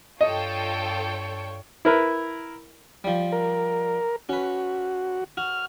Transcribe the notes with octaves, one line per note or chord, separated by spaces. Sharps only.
G2 F4 A4 C#5 D#5 G5
E4 A#4 B4
F3 G3
A#4
C#4 F#4 B4
F#4 F6